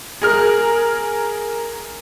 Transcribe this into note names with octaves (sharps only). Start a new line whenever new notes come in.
G#4 A#4 F6